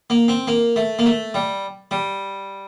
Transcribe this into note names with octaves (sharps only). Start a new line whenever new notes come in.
A#3
C4
A#3
A3
A#3
A3
G3
G3